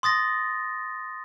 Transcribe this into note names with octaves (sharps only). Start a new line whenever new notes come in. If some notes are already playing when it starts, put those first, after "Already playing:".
C6 D#6 A6 A#6